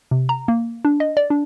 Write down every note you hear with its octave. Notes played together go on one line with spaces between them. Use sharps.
C3
A#5
A#3
D4
D#5
D5
D4